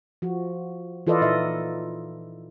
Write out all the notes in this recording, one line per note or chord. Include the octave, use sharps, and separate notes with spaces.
F3 F#4
E3 F4 A4 B4 D5 D#5
A#2 D#4 D#5 E5